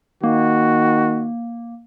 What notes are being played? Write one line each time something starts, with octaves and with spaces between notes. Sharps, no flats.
D#3 A#3 F#4